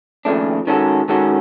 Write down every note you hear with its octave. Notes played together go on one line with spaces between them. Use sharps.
D#2 C#3 F3 A3 D4
D#3 G#3 C#4 F#4 A4
D#3 G#3 C#4 F#4 A4